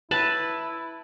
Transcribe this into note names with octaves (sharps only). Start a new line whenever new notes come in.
E4 B4 A5